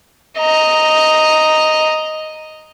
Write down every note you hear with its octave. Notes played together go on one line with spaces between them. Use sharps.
D#5 A#5